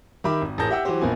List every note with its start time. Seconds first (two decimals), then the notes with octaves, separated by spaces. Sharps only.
0.24 D#3 G4 E5 B5 D6
0.42 G#1
0.58 A1 G#4 A#4 A5 G6 A#6
0.70 G4 E5 F#5 G5 E6
0.85 E3 F#3 F#4 G4 C5
1.01 A#1 A#3 B3 G#5